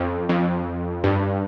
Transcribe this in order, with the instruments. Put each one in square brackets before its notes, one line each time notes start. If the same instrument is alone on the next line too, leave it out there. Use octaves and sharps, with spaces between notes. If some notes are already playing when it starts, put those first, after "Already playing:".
Already playing: [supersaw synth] F2
F2
G2